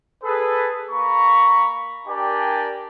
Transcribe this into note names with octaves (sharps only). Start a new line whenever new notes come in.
G#4 A4 B4
A#3 A#5 B5 C#6
D4 G4 A#4 D5 G5 G#5